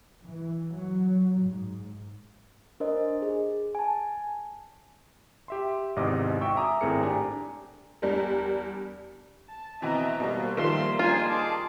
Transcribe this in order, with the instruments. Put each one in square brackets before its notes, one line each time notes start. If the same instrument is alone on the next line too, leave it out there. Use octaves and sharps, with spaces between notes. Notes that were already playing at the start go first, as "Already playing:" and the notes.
[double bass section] E3
F#3
G#2
[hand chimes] D4 A#4 C5 D#5
G#4
G#5 A5
[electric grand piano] G4 E5 C6
G#1 E2 G#2 C3 D#5 D6
F#4 E5 G5 C#6 E6
E5 G#5 A#5 D6 D#6
G#1 A2 C4 G#4 A#4 C#7
D4 G4 G#5 A#5
[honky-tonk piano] E2 G3 D4 A#4
[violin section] A5
[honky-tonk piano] B2 E3 C4 [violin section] D#5 E5 A#5
[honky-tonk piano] B2 G3 [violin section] A#3 C5
[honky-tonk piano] D#3 F3 G3 [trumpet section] E5 C6
[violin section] A#3 D#4 G#4 [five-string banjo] F4 [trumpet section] C5 G#5
[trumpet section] G#4 C6 D6 [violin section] A5